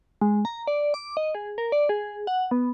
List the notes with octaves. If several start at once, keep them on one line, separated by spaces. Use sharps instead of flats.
G#3
A#5
D5
D6
D#5
G#4
A#4
D5
G#4
F#5
B3